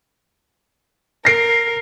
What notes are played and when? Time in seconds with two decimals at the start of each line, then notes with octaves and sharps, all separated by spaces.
1.25 A#4 A#6 C7 D7